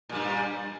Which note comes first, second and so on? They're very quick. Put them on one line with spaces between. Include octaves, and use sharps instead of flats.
A#2 G3 G2